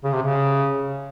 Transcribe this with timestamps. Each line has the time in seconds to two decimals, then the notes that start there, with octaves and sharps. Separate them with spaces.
0.04 C#3
0.13 C3
0.22 C#3